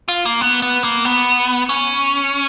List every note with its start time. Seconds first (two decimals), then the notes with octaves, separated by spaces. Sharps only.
0.08 F4
0.26 A#3
0.41 B3
0.62 B3
0.84 A#3
1.05 B3
1.69 C#4